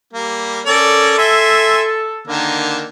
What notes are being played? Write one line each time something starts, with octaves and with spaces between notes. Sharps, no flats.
G3 A#3
C#4 A4 A#4 D5
E5 G#5 C6
D3 D#3 A#3